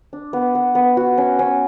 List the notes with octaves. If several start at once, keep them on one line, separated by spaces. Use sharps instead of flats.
D4
B3
B3
B3
F#4
C#4
C#4